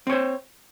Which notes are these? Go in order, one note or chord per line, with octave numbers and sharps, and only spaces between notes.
C4 C5 C#5